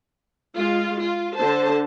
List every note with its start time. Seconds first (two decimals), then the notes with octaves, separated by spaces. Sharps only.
0.56 G#3 F4
1.02 F4
1.38 D3 C5 A5